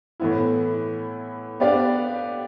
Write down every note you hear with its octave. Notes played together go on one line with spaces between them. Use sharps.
A2 E3 B3 E4
B3 D4 G4 D5 F5